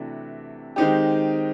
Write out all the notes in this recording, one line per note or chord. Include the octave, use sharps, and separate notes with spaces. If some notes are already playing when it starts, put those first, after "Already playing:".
Already playing: C3 E3 A3 D4 F#4
D#3 G#3 C4 D#4 G4